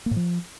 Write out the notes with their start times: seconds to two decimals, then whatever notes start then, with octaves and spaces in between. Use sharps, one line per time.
0.06 A#3
0.11 A2
0.16 F3